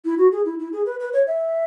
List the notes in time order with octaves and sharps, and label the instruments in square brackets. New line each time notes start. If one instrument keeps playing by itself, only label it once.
[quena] E4
F#4
G#4
E4
E4
G#4
B4
B4
C#5
E5